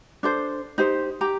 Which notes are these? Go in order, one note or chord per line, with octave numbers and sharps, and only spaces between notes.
D4 A4 C5
D#4 G4 C5
G4 G5 A#5